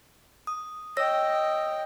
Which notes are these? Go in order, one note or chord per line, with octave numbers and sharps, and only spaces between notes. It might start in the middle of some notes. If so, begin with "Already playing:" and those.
D#6
C#5 D#5 G5 E6 A#6